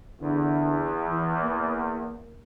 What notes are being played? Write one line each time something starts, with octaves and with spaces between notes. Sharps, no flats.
E2 D3
E3
A#3